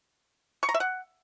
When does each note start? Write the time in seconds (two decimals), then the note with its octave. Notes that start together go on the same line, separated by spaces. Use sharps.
0.63 C#6
0.69 A#5
0.74 E5
0.80 F#5